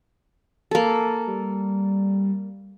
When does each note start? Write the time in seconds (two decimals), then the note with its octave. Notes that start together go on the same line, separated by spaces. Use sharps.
0.71 A#3 A4
1.27 G3